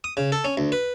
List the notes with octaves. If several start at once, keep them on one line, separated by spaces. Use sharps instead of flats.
D#6
C#3
A4
C#4
D2
B4